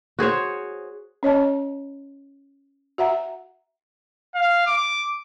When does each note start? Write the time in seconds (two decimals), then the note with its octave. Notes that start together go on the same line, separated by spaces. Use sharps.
0.19 F#4 G#4 C5 C#5
1.23 C#4 C#5 D#5 A5
2.98 F#4 E5 F#5 A#5
4.35 F5
4.67 D6